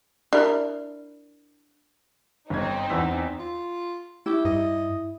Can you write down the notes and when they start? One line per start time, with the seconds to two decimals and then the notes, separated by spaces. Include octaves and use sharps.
0.33 D4 E4 A#4
2.50 G1 G2 C4 D#4 G#6
2.90 E2 E6 B6
3.39 F4
4.26 E4 G4
4.45 G2 D#5